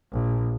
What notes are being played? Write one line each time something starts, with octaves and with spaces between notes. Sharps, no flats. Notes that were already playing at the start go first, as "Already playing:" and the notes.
A#1